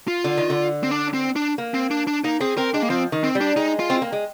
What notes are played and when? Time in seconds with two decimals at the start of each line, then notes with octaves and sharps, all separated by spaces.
0.08 F4
0.24 D3
0.37 D#3
0.50 D3
0.83 C4
0.91 D4
1.14 C4
1.36 D4
1.58 A#3
1.74 C4
1.91 D4
2.07 D4
2.24 A#3 D#4
2.40 C4 G#4
2.57 C4 A#4
2.74 G#3 D4
2.82 A#3
2.90 F3 C4
3.12 D#3
3.24 C4
3.35 G3
3.41 D4
3.56 G#3 D#4
3.79 F4
3.90 C4
4.02 A#3
4.12 G#3